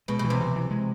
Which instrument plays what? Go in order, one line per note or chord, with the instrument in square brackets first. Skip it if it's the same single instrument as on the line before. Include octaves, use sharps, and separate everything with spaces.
[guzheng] B2 [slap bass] G#3
[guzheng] B2
[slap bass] E3
[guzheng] C3
[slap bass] E3
E3
G#3